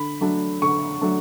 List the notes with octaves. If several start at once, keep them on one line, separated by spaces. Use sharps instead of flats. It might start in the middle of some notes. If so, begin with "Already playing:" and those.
Already playing: D3 B5
F#3 A3 D4
D3 C#6
F#3 A3 D4